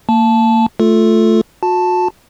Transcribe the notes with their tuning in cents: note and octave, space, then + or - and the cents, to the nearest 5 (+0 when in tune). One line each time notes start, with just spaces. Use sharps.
A#3 -30 A5 -10
A3 +0 F4 +5 A4 +0
F#4 -35 A5 +0